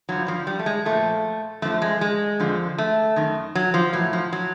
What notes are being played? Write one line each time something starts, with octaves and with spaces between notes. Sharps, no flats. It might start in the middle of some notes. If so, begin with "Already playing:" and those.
G2 D3 F3 F#3
F3
G3
A3
G#3
A#2 F3 A3
F#2 D3 F3 A3
G#3
G#3
F2 D3 F3
A3
F#2 D#3
F#3
F3
A2 E3 F#3
F3
F#3